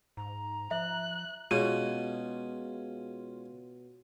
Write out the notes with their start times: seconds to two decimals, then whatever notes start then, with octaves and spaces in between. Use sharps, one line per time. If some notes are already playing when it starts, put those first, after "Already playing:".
0.17 G#2 A#5
0.71 F3 E5 F#6
1.51 B2 G#3 C#4 F4 G#4 D#7